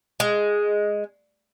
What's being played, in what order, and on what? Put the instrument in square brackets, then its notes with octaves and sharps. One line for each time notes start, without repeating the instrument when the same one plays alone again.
[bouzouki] G#3